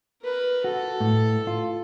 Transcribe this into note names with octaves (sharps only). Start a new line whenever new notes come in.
A#4 B4
F#4 A4
A2
F4